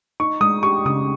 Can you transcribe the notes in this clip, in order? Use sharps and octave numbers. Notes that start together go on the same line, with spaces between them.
D#4 C#6
G#3 D#6
G4 C#6
C#3 D#6